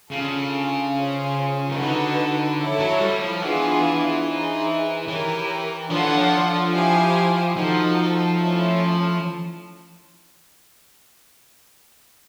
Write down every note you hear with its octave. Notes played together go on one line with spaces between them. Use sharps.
C#3 D4 F4 A4
C#4 F4 G#4 C5
D#3
D3 D#4 F#4 B4
E4 A4 C#5
F#3
G3
F3
E3 B3 D4 F4 G#4
D#4 G#4 C5
E3 G4 A#4 C#5
F3 D4 F4 A4 C#5 F#5
E3
F3
E4 G4 C5 F5 G#5
F3 D#4 F#4 A4 C5
A3 C#4 E4 A4 C#5